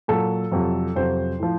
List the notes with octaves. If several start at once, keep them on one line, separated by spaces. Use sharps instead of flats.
A#2 F#3 A4
F2 C3 F#3
F2 C3 F#3 C5
A2 F3